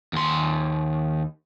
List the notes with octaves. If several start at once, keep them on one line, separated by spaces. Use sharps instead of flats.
D#2 C6